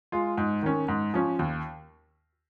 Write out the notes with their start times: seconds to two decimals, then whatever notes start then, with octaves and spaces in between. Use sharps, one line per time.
0.12 G#3 F4
0.38 G#2
0.63 D#3 C#4
0.88 G#2
1.14 F3 C#4
1.39 D#2